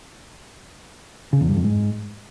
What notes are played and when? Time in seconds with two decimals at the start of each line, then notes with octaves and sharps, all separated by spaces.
1.33 C#3
1.41 E2
1.48 G2
1.56 F2
1.64 G#2